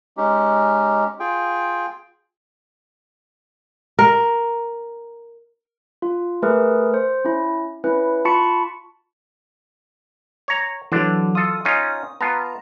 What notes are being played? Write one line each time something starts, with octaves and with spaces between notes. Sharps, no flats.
G#3 C#4 D#4 G4
F4 G#4 G5
A#4
F4
A3 G#4 A#4 B4
C5
C#4 E4
C#4 E4 B4
F4 A5 B5 C#6 C#7
C#5 A#5
D3 E3 F#3 D4
F4 A4 D#6
C#4 D#4 F4
B3 F4 A5 A#5